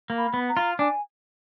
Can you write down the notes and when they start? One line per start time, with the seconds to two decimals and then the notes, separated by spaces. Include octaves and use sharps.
0.10 A#3
0.18 B5
0.34 B3
0.49 A#5
0.57 F4
0.79 D4 G#5